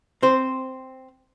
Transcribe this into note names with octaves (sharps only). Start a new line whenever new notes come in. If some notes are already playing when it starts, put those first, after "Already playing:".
C4 C5